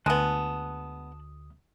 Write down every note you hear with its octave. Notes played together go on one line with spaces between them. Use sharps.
D2 G#3 B3 A5 D#6 F#6